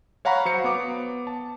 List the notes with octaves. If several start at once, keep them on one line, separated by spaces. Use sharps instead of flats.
C#5 F5 F#5 A#5 B5 C#6
F#3 C5 C#7
B3 D6
A5